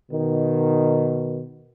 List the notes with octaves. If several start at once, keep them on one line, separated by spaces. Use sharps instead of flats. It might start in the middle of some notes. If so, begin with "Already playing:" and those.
B2 D#3